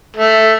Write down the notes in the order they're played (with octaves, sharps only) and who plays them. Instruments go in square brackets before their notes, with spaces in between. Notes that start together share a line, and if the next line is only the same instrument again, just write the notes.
[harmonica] A3